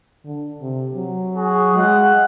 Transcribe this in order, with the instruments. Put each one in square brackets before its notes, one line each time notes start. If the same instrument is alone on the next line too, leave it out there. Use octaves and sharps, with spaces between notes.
[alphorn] D3
C3
F#3
[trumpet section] F#4 G#4
[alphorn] G#3 [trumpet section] F5 F#5